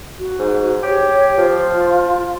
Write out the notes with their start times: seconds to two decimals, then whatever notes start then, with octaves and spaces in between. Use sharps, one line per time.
0.19 F#4
0.39 G#2
0.83 G4 C#5
1.38 F3 F4